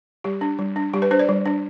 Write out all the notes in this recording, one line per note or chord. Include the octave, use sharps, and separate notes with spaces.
G3 G4
D4
G3
D4
G3 G4
B4
D4 C5
D5
G3
D4